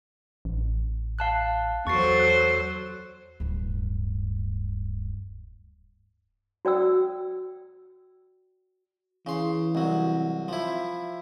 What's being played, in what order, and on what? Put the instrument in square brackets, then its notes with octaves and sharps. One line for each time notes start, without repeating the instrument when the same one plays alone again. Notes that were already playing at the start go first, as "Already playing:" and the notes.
[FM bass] A1
[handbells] F5 A5 F#6
[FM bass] E2 [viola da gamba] F#3 A4 C5 [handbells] C#6 A6 C7
[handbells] F#6 C7
[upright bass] D1 G2
[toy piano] F#4 D5 G5 E6
[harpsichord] C#3 C6 [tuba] E3
[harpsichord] C2 F#3
F3 E4